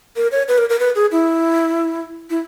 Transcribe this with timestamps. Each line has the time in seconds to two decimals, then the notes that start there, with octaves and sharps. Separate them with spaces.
0.16 A#4
0.32 C#5
0.48 B4
0.58 A#4
0.70 A#4
0.80 B4
0.95 G#4
1.12 E4
2.30 E4